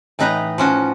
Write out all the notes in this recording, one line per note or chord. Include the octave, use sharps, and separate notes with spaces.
A2 E3 D#4 B4 D#5 A#5
F3 C#4 F#4